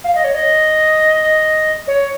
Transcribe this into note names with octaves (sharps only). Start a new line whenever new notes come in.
F5
D#5
C#5
D#5
C#5